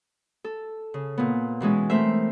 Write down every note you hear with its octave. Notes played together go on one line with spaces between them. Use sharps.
A4
C#3
A#2 B3
B2 E3 G#3 C#4
A3 C4 A#4 C5 E5